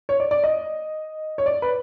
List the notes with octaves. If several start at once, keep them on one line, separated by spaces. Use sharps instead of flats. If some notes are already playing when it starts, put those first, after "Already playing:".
C#5
D5
D5
D#5
C#5
D5
B4